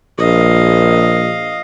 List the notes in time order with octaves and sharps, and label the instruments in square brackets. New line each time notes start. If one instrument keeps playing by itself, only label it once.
[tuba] A#1 [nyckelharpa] D#5 F5